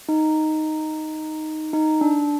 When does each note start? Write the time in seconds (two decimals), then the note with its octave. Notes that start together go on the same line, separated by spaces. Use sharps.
0.09 D#4
1.73 D#4
2.01 D4